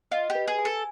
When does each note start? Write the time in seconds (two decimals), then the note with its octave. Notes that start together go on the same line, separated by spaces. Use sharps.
0.11 F4 D#5
0.30 G4
0.35 B4
0.48 G#4
0.59 G#5
0.65 A4